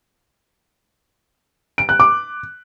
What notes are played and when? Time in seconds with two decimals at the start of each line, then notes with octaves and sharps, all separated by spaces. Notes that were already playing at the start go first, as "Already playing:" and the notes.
1.78 D7
1.89 F#6
2.00 D6